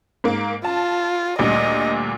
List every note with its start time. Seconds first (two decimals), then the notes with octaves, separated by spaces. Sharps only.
0.24 G#2 A#3
0.65 F4 A5
1.39 D2 A#2 G3 D#5